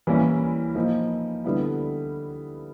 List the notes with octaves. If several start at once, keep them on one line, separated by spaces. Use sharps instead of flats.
E3 G3 A#3 C#4 E4
F3 A#3 D#4
D3 G3 B3 E4